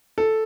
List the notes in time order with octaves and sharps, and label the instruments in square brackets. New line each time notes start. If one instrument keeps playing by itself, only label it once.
[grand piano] A4